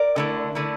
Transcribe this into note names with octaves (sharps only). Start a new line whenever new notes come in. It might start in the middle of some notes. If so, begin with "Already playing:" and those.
Already playing: A#4 D5
D3 A3 E4
D3 A3 E4